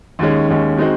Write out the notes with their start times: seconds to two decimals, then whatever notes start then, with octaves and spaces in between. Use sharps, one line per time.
0.19 D#2 D#3 G#3 C#4
0.49 D#2 D#3 G#3 C#4
0.77 D#3 G#3 C4 D#4 F#4